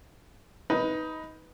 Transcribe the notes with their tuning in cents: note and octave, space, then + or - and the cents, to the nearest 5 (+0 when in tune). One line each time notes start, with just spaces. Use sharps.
D#4 +15 B4 +0